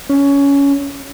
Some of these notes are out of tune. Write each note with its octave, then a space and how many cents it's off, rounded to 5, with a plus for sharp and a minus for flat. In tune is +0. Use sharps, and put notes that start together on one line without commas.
C#4 +15